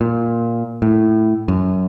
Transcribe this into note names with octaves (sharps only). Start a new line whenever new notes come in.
A#2
A2
F#2